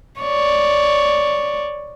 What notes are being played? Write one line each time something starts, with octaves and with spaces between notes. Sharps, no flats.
C#5 D5